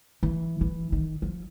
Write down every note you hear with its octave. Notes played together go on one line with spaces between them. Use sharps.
E3
E3
D#3
F3